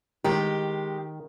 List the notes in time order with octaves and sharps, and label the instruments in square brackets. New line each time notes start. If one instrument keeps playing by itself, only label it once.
[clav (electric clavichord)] D#3 [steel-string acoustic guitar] G#3 G4